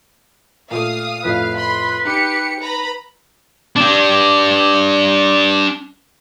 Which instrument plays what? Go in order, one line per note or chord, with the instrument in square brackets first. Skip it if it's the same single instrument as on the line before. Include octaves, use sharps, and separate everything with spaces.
[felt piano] A#2 A3 [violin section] F5 D#6
[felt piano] F2 A2 [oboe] B4 [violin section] F5
[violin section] B5 C6
[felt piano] D#4 [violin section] G4 C#7
[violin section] B4 A#5 B5
[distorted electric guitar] D4 G4